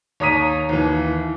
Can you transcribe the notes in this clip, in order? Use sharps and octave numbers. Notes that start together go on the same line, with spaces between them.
D#2 C#5 A#5 D#6 B6 D#7
D#2 E3